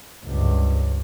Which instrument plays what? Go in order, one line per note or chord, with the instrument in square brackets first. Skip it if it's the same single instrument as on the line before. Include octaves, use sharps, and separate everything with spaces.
[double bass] C#2 G2